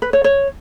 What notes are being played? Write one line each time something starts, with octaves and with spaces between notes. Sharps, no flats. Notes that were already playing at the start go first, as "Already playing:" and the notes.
B4
C#5
C#5